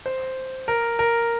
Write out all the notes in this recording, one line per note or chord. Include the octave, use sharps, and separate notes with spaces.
C5
A#4
A#4